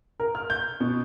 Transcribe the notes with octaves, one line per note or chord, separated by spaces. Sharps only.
A#4
F6
G6
B2